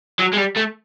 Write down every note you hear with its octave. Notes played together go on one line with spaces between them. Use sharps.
F#3
G#3
G3
A3